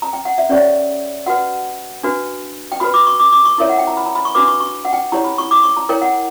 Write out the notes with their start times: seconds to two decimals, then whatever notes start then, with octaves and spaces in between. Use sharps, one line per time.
0.02 A#5
0.13 G5
0.25 F#5
0.38 E5
0.49 C#4 G4 C#5 D5
1.26 F#4 B4 F#5
2.03 D4 F#4 B4
2.72 G5
2.80 F#4 B4 B5
2.94 D6
3.07 C#6
3.20 D6
3.32 D6
3.45 C#6
3.58 E4 A#4 C#5 E5
3.69 F#5
3.78 G5
3.87 A#5
3.97 B5
4.06 A#5
4.15 B5
4.25 C#6
4.35 D4 F#4 B4 D6
4.48 C#6
4.60 C#6
4.85 F#5
4.93 G5
5.12 E4 G4 C#5 A#5
5.24 B5
5.38 C#6
5.51 D6
5.63 C#6
5.77 A#5
5.89 E4 A#4 C#5 G5
6.01 F#5